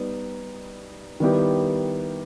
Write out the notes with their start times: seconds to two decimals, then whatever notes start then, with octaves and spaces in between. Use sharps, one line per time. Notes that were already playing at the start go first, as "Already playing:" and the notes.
Already playing: G3 B3 D#4
1.20 D#3 G3 B3 E4 G4